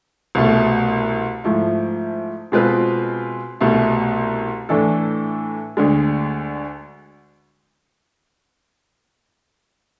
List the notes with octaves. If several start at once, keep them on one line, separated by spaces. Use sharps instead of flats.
C2 B2 A3
G#2 F3 A3 E4
B2 G#3 C4 F4 B4
C2 B2 A3
A2 E3 A3 D4 A4
D2 D3 G#3